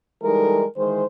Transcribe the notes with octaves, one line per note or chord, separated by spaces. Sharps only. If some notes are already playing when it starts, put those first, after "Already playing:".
E3 G3 G#3 D#4 A4 A#4
D#3 E3 G#3 C5